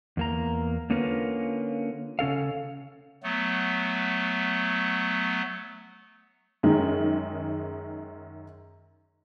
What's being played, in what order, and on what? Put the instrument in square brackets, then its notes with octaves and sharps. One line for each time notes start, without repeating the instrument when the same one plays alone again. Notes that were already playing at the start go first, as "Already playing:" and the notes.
[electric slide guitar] E2 A#3 A#5
D3 A#3 C#4 F4 A#4 B4
C#3 C#4 A4 F5
[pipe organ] F#3 A3 B3
[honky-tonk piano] F#2 D#3 G#3